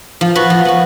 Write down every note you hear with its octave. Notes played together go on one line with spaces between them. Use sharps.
F3
B3 F#4
F3
B3 F#4